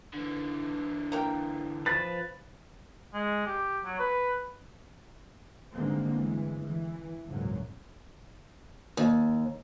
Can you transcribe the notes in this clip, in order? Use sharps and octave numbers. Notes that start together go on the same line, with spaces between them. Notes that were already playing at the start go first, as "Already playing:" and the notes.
D3 E3
A#3 A#4 G5
F3 B4 A6
G#3
G4
F#3
B4
G2 D3 D#3 G#3 A#3 C4
G1 E3 G#3
E3
G#1 C#2 F#2 A#2 F#3
D#2